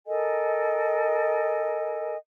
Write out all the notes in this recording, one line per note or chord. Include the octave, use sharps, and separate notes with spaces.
A4 A#4 D#5 G#5